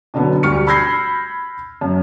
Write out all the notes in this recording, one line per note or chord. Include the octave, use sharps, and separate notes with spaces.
B2 D3 F#3 B3
D2 G3 C#6 F6 C#7
B5 E6 G6 G#6 A#6 C7
F#2